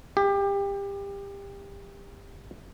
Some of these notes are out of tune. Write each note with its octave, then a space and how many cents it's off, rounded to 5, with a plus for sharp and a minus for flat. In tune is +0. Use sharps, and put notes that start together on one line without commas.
G4 +25